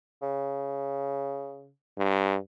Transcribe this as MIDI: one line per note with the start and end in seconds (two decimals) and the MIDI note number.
0.23 1.70 49
1.98 2.37 43